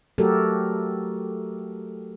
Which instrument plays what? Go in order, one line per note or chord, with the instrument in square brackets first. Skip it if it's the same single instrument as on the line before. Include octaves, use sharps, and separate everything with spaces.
[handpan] F#3 A3 F#4 G4 A4 A#4